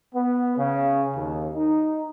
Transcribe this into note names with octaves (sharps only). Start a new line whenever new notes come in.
B3
C#3
D#2
D#4